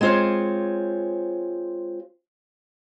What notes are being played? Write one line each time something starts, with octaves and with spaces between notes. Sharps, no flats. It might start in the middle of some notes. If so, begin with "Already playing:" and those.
G#3 C4 F4 C5 C#5